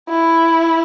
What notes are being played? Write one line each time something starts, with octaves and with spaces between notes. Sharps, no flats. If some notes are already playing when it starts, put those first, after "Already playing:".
E4